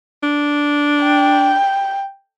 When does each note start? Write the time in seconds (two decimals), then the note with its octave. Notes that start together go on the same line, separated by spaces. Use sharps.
0.23 D4
1.04 G5